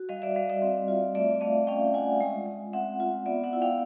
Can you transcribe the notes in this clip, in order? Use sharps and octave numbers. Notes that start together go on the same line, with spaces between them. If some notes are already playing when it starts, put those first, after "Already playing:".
Already playing: F#4
G3 D#5 F5
D5 E5
G3 D#5 F5
D5 E5
C4
F4
A3 D5 E5
A3 D#5 F5
C#4 F5 G5
F4 F#5 G#5
G#3
G#3
C4 E5 F#5
F4
B3 D5 E5
E5 F#5
E4
F5 G5